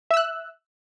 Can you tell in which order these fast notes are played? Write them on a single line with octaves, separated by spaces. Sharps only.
E5 E6 F#6